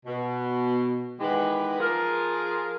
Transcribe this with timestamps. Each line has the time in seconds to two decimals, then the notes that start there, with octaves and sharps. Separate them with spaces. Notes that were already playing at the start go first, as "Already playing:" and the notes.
0.06 B2
1.20 D#3 E3 G#3 B3 G4 B4
1.79 F3 F4 G#4 A#4